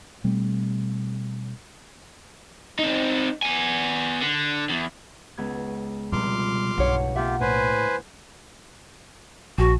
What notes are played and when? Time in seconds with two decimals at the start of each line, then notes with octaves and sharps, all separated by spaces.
0.24 B2 G3 A3 C4
2.79 C4 D#4
3.42 B3 G#5
4.22 D3
4.69 E2
5.37 C#2 B3 G#6
6.12 F1 B2 G3 B5 C6 D6 F6
6.78 B1 G2 C#5 F5 F#5
7.16 A#3 F4 G4 E5 F#5
7.41 A2 B4 C5 G#5
9.58 A#1 F#4